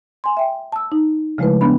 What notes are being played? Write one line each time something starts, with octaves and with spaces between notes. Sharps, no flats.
G#5 C6
E5 G5
A5 E6
D#4
C#3 F3 G#3 A3 E4 B4
B3 D4 B5